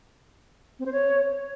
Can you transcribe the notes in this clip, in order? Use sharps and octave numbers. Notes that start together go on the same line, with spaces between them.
C4
C5
C#5